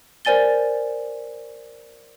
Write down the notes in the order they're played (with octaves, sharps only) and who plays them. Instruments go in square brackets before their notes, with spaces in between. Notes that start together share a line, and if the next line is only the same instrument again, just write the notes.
[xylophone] A#4 C5 D5 G#5 A6 G7